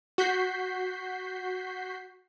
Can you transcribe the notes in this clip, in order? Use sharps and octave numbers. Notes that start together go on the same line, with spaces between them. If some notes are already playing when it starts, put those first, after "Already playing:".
F#4 G6 B6 C7